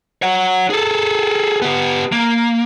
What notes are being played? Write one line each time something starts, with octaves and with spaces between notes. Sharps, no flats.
C#5 F#5
G#4 A4
B3 G4
A#3